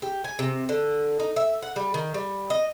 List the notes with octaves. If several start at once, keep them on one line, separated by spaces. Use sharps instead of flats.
G4
G#5
C3
D3
D#4
E5
F#5
G3
D#3
G3
D#5